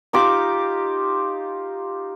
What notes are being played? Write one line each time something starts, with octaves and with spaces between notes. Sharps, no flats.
D#4 F4 G4 D6